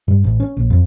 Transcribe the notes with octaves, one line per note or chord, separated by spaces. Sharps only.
G2
A1
C#4
A#1
F2